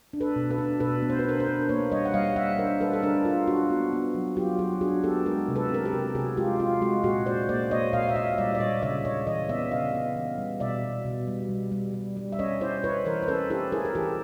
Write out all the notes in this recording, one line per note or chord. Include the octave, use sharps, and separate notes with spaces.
D4
A4 B4
B2
A4 B4
D4
B2 A4 B4
B3
C5
B4
D4 A#4 C5
A#4 C5
D4
A#3 B4 C#5
G3 C#5 D#5
F#5
G3 D#5 F5
G3 E5 F#5
D4 A#4 C5
G3 A4 B4
A4
D4 G#4 A#4
F4
D4 F#4
B3
B3
F#3
F#3 F4 G4
F#3 F#4 G#4
D4 F#4 G#4
B3 G4 A4
G#3 G#4 A#4
C3
A4 B4
C4 A#4
G4 A4
C3
C3 F#4 G#4
G#3 F4 G4
C4 F4
G#3 F#4
A#2 F#4 G#4
A#2 C5 D5
A#3 C5 D5
A#3 C#5 D#5
A#2 D#5 F5
E5
A#2 D#5 F5
G3 D5 E5
D5
A#2 C#5 D#5
C#3 D5 E5
C#3 C#5 D#5
E3 C#5 D#5
B3 D5 E5
C#3 D#5 F5
B3
E3
G3
B2 D5 E5
B2
B2
G3
G3
G3
G3
G3
E5
C#4 C#5 D#5
E4 C5 D5
E4 B4 C#5
E3 A#4 C5
C5
C#4 A4 B4
E4 G4 A4
E4 G#4 A#4
A#4
E3 G4 A4